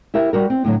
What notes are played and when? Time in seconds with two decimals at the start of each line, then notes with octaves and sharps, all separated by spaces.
0.14 E4 G4 A#4 E5
0.33 G3 F#4 A#4
0.50 C4
0.65 A2 D3 F#3